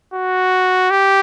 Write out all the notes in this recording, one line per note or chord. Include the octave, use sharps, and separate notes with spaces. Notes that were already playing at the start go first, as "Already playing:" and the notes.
F#4
G4